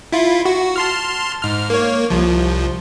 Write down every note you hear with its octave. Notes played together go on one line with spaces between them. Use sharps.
E4 F4
F#4
A5 C6 F6
G#2 F6
A#3 C#5
C2 F3